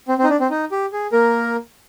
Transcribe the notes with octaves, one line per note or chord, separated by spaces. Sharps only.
C4
C4
D#4
D4
C4
D#4
G4
G#4
A#3 A#4